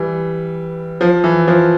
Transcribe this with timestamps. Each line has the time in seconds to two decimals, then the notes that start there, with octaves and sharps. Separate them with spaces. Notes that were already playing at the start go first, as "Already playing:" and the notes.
Already playing: E3 G3
1.01 F3
1.24 E3
1.47 F3